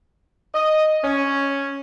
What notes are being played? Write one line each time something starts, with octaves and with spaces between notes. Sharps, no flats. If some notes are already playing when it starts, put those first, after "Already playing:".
D#5
C#4